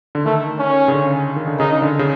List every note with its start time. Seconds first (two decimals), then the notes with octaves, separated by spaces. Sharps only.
0.15 D3
0.25 D#3 A3
0.59 C#4
0.88 C#3
0.92 D3
1.36 D#3
1.48 D3
1.59 C#3 D#4
1.82 D3
1.99 C#3